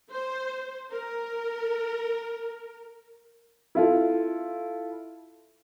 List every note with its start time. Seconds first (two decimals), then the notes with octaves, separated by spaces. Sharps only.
0.12 C5
0.92 A#4
3.75 E4 F4 A4